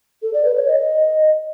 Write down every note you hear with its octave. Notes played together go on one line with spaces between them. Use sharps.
A4
D5
B4
C#5
D#5